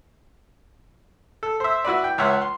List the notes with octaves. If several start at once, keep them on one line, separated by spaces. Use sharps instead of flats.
A4
C5 E5
E4 F#4 B4 D5
G5
C#2 C#5 E5 F#5 C6
C6